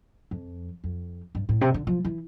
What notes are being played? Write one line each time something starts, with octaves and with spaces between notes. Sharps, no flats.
F2
F2
G2
A2
C3
D3
F3
E3